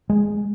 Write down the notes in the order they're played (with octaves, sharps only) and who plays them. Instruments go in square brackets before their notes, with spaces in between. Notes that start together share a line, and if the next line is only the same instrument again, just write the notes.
[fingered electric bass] G#3